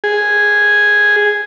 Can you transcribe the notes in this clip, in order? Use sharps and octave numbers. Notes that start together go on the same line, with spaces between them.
G#4